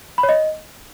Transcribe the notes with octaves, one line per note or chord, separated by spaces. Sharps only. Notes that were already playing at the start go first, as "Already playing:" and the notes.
B5
C#5
D#5